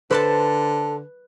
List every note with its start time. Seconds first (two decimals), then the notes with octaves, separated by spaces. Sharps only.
0.11 D3 A4 B4 C5 A5